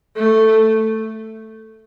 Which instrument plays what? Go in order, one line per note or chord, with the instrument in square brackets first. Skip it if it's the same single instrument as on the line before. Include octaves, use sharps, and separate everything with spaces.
[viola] A3